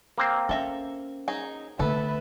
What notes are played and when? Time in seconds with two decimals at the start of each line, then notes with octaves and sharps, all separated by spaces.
0.18 A#3 C4 C5
0.49 C#4 A4 E5 A#5
1.28 F#3 D#4 G#4
1.79 D3 A3 B3 A4 B4 E5